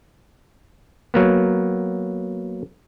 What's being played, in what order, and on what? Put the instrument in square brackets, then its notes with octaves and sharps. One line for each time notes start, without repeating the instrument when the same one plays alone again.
[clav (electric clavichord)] F#3 A#3 B3